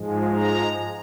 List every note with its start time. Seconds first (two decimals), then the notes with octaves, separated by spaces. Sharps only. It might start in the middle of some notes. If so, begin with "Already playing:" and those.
Already playing: G#2 F3 G#3
0.35 A#5